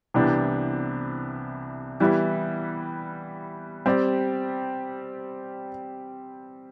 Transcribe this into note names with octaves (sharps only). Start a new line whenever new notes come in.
C2 C3 E3 B3 D4
E3 G3 B3 E4
G3 C4 G4 D5